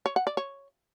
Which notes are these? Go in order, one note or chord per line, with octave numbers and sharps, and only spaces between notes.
C#5
F#5
D5
C#5